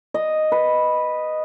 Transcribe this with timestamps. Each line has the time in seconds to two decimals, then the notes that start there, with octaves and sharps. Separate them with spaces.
0.14 D#5
0.52 B4